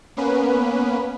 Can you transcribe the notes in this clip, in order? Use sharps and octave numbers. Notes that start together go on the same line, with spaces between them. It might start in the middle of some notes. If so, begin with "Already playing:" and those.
A#3 B3 C#4 B4